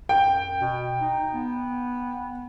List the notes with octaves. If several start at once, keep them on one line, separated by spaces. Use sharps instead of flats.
F#2 G5
B2
D#4
B3